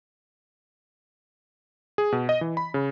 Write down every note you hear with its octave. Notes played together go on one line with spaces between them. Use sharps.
G#4
B2
D#5
E3
B5
C#3